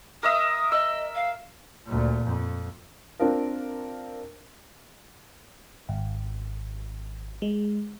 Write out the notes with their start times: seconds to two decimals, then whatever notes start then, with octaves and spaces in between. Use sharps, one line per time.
0.23 A#4 D#5 E5 D#6
0.72 D#5 E6
1.15 F5
1.86 D2 A#2
2.23 F2
3.19 C4 D4 F4 A#4
5.89 G#1
7.42 G#3